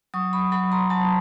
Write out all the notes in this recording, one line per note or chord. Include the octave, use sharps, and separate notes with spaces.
F#3 C#6 D#6
B5 C#6
F#3 B5 C#6
A#5 C6
F#3 A5 B5